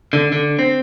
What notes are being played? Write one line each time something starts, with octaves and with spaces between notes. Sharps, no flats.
D3
D3
C4